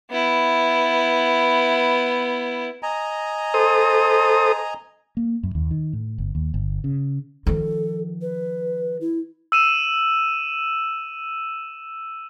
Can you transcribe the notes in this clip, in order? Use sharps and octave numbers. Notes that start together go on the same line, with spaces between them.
B3 E4
D#5 G#5 A#5
A4 C5 D#6
A#3
F#2
D#2
D#3
A2
G1
D#2
G1
C#3
D#3 F3 A4
B4
E4
E6 D#7 E7